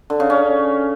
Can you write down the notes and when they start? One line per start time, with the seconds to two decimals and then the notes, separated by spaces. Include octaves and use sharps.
0.10 D3
0.20 C#3
0.30 C#4